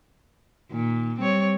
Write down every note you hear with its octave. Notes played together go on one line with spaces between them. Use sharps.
A#2 D#3
G3 C4 C#5